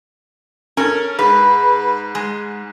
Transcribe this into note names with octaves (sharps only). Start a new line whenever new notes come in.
C#4 A4 A#4
G#2 B4
G#3